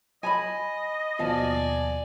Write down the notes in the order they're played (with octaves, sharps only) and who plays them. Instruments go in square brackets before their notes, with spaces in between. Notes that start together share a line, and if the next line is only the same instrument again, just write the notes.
[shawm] D#5 [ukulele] G#5 A#5 B5
[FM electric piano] D#2 B2 F3 [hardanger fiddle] D5 G#5 [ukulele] F5 A5